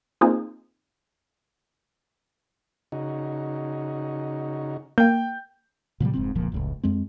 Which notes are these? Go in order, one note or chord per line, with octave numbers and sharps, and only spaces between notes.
A#3 C4 D#4 F4 G#4
C#3 D#4 F#4
A#3 G5 G6
A#2 C#3 F3 G3
F1 G#2 C4
E1 C#2 A#2 F3
F1 C#2 A2
F2 G#3 C4